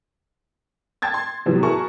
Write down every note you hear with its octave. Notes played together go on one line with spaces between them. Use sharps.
G5 A5 G#6 A6
C6
A2 C3 F3 F#3 B3
E4 F#4 G#4 A#4 A5 C#6